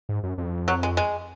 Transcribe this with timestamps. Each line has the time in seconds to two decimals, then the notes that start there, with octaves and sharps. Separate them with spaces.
0.09 G#2
0.23 F#2
0.38 F2
0.68 F#3
0.83 G#3
0.97 G#3